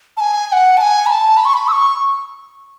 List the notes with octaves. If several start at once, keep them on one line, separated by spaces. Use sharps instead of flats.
A5
G#5
G#5
F#5
A5
G#5
B5
A5
B5
C#6
B5
E6
C#6